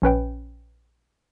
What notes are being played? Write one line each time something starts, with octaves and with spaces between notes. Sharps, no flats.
A#1 C#4 B4 G5